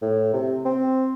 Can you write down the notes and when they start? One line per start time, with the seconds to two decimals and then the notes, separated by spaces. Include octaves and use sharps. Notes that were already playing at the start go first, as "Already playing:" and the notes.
0.02 A2
0.33 C3
0.65 C4